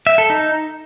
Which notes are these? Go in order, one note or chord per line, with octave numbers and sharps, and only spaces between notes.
E5
A4
D#4